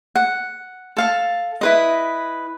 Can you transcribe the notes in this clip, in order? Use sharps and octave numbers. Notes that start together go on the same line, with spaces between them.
F#5
A4 F5 A5
E4 B4 D#5